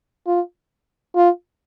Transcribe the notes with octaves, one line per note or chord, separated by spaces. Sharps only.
F4
F4